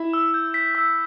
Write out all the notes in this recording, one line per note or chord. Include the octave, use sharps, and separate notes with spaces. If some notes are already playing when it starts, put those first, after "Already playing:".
Already playing: E4 E5
E6
G6
B6
E6